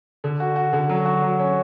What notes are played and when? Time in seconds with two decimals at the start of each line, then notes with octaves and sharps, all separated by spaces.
0.24 D3
0.40 F#4
0.56 F#4
0.73 D3
0.89 F#3
1.05 F#4
1.22 F#3
1.39 C#4